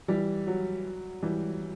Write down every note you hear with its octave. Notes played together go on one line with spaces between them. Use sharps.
E3 G3
F#3
E3 G3